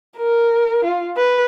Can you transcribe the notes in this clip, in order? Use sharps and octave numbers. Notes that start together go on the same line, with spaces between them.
A#4
F4
B4